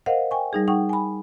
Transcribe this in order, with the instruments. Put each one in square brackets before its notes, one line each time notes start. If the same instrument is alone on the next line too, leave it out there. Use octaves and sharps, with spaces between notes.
[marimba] A#4 C5 D#5 F5 F#5
G5 G#5 C#6
G3 D#4 G#4
D#4 F#5 G5 C#6
G#5 B5